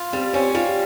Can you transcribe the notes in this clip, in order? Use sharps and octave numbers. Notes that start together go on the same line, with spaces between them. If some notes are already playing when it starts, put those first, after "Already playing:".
Already playing: F4
G3 C4
C4 C#4
G3 F4